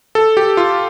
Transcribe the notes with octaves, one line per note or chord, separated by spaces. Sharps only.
A4
G4
F4